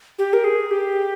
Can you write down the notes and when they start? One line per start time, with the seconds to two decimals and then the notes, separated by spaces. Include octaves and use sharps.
0.19 G4
0.33 A#4
0.44 G#4
0.71 G4